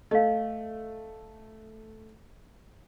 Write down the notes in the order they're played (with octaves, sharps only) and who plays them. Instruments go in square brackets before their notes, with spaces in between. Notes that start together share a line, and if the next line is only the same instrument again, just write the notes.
[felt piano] A3 [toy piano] D#5 F5